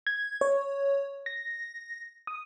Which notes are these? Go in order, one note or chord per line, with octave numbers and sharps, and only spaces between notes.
G#6
C#5
A#6
D#6